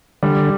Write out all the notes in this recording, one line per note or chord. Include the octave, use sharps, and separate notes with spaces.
D3 G3